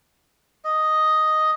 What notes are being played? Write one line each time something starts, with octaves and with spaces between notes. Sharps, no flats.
D#5